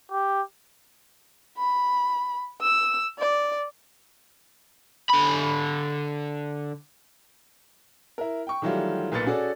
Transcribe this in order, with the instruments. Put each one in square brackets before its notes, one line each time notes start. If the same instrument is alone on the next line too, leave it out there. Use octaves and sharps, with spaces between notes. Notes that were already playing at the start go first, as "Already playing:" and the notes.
[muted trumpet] G4
[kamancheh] B5
E6
D5
[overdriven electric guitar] D3 B5
[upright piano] E4 A#4
G5 C#6
D#3 E3 F#3 G3 A3 F4
B1 A#2 B4 A6 C#7
C#4 F#4 G#4 A4 D5